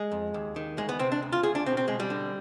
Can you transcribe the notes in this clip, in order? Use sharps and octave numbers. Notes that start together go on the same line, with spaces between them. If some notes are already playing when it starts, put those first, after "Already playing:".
Already playing: G#3
F2
D#2
D#3
D2 G#3
B3
C3 C4
D4
D2
F4
D2 G#4
D4
B2 C4
C4
B2 G#3
G3
D3